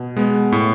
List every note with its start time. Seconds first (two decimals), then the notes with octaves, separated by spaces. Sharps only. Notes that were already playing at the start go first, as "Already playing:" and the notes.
Already playing: B2
0.17 G#3 B3
0.52 A2